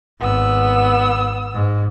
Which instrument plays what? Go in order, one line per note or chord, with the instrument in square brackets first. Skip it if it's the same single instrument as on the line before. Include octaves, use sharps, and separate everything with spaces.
[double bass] G#1 [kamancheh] B3 E6
[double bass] G#2